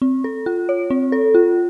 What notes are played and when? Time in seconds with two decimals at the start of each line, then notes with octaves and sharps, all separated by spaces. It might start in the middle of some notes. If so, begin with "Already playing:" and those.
0.02 C4
0.24 A4
0.46 F4
0.69 C#5
0.90 C4
1.12 A4
1.35 F4